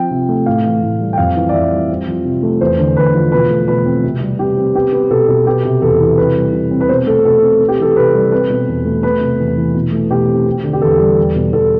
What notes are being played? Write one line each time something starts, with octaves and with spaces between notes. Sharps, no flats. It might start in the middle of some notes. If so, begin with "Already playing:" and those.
Already playing: F3 C4 G5
C3
A3
A2 F5
E3
A2
G3
G5
F2 F5
E3
D5
F2 E5
G3
C4
F3
C3
A3
E2 C5
D3
E2 B4
F3
B2 B4
A3
B2 B4
C4
C3
G3
C3 G4
C4
B3 G4
B3
B2 A4
B2
B3 G4
C3
E2 A4
E3
C3 B4
G3
C3
C4
B4
B2 C5
A3 A4
B2 A4
C4
B3
G4
E3 A4
C3 B4
G3
C4 B4
B2
E2
A3
B3 B4
C3
E2
E3
B2
A3
B2 G4
C4
C4
D3
G4
E2 A4
G3
E2
B2
E2 A4